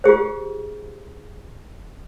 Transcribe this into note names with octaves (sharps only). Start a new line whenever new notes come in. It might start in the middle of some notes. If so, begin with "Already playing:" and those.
F4 G4 G#4 C5